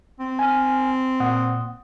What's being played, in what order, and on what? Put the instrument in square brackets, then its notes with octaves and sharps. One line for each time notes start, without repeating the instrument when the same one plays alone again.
[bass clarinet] C4
[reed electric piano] G#5 F6
A#2 F#5 D#6